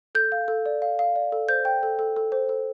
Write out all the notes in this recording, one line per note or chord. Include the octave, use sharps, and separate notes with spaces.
A4 G6
F5
A4
D5
F5
F5
D5
A4
C5 G6
G5
A4
A4
A4
C5
A4